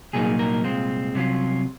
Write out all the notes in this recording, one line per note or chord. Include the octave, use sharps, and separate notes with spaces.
C2 A#2 F#3 A#3 D#4 G#4
A#4
C2 A#2 G#3 C4 F4
C2 C3 F#3 C#4 F4